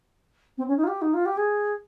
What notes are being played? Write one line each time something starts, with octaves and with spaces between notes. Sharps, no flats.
C4
C#4
D#4
F4
G4
D#4
F4
G4
G#4